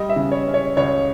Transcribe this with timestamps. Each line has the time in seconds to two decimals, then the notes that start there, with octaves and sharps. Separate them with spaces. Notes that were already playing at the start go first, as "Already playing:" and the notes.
Already playing: G3 D#5
0.09 E5
0.16 C#3
0.32 C#5
0.48 C#4
0.54 C#5
0.77 C#2 C#5